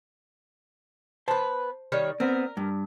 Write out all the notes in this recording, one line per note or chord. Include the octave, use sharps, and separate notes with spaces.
B3 B4 C5 A5
D#3 G3 C#5
B3 C4 A#4
G2